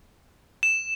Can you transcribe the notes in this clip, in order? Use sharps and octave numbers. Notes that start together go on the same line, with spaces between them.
E7